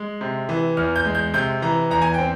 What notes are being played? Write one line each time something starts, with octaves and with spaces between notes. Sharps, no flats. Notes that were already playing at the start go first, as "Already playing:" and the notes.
Already playing: G#3
C3
E3
E2 F6
G6
G#3
G6
C3 G6
E3 A#5
E2 A#5
G#5
C4 G5